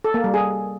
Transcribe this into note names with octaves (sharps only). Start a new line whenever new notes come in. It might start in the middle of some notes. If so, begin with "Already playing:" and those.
A4
A#3
G3
G#4